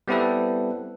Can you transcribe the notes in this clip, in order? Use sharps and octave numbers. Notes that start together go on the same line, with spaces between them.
G3 B3 C4 E4 A4 B4